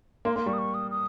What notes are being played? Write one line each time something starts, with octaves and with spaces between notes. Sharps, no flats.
A#3 C6
A#3 C6
G3 C#6
D#6
C#6
D#6
D#6